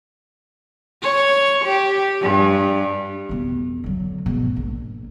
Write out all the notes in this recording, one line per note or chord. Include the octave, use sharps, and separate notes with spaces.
C#5
G4
G2
F2 B2
D3 F#3
G#2 B2
A#1